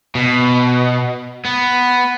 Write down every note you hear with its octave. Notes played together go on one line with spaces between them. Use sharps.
B2
B3